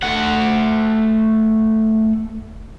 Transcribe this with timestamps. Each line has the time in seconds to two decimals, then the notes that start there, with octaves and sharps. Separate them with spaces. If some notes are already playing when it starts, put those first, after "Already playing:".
0.03 A3 F#5